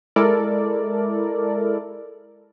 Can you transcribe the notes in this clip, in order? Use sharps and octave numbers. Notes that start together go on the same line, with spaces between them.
G#3 E4 A4 A#4 D5